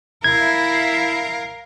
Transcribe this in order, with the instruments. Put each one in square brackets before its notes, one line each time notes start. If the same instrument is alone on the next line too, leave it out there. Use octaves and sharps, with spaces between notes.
[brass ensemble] E4 [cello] A#4 F5 [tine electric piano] G#6